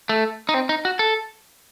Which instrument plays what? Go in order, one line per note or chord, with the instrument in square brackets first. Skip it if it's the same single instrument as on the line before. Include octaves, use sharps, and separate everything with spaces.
[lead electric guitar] A3
D#4
C4
D#4
F#4
A4